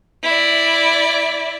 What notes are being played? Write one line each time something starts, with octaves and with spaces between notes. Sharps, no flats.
E4 D5